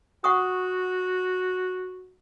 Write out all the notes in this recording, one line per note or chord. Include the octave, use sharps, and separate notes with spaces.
F#4 F#5 C#6 D#6